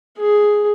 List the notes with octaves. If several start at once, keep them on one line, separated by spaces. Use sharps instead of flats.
G#4